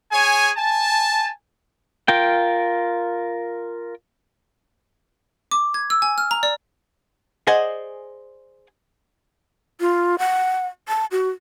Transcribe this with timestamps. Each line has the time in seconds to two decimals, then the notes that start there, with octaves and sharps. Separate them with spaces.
0.11 G#4 C#5 G#5
0.57 G#5 A5
2.08 F4 A#4 G5
5.51 D6
5.74 G#6
5.90 E6
6.02 G#5
6.18 F6
6.31 A#5
6.43 D5
7.47 G#4 C5 D5 D#5 F#5 G#5
9.80 F4
10.19 F#5
10.88 A5
11.12 F#4